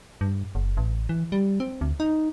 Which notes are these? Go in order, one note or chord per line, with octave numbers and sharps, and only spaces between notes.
G2
F#1
A1
E3
G3
C4
D2
D#4